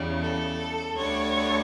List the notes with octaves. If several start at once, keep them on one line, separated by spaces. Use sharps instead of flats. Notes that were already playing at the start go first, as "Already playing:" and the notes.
Already playing: E2 C#3 G3
A4
D2 D3 G3 C#5